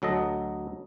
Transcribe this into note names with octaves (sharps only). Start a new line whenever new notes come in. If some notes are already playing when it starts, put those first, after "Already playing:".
D2 F#3 A4 D#5